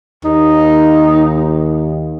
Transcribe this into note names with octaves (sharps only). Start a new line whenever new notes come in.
D#2 D#4